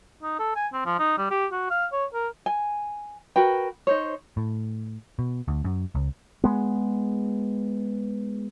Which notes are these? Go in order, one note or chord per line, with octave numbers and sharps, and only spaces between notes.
D#4
A4
G#5
C4
F3
D#4
G3
G4
F#4
F5
C#5
A#4
G#5
F#4 A#4 B4 G5
D#4 C5 C#5
A2
B2
D2
F#2
C#2
G#3 B3